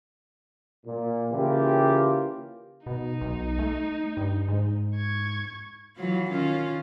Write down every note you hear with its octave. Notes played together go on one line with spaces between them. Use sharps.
A#2
C#3 E3 A#3 F4 G4
B2 D#4
B1
A3
G2
G#2
C#6 G#6
E3 F#3 F4
D#3 C#4 F4